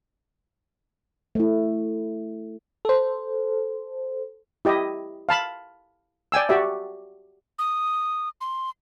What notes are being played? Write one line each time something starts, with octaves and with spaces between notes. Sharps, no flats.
A3 E4
A4 C5
E4 G4 D#5
F5 A5 B5
D5 G5 G#5 E6
F#4 G4 D5 E5
D#6
C6